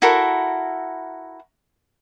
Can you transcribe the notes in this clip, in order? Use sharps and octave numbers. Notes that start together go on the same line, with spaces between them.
E4 F#4 A4 A#4